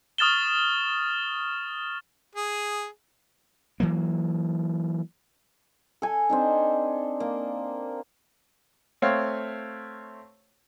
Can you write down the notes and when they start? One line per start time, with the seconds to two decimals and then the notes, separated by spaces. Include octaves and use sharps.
0.18 C#6 D#6 F6 A6 E7 G7
2.35 G#4
3.80 E3 F#3 A#3
6.02 A4 G#5
6.30 C4 D4 D#4
7.20 A#3
9.02 A3 C4 C#5 F5